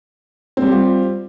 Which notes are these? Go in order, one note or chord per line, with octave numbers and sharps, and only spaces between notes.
G3 C4 F4 G4